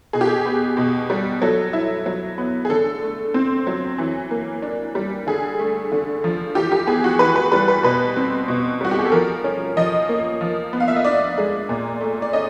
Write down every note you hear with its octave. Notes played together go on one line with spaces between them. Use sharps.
B2 G#4
G4
G#4
B3
B2
G3
F#3 A4
E4
F#3
B3
G#4
D3 A4
A3
C4
F#3
E3
A#3
D4
G3
D3 G#4
A3
D3
F3
E3 G4
G4
B3 G#4
F#4
E3 B4
B4
G3 B4
B4
B2 B4
C4
B2
G3 F#4
G4
G#4
A4
F3 A#4
C#4
F3 D#5
A#3
F3
B3
F5
E5
D#5
D4 D5
G#3
A#2
A3
D5
C#4 D#5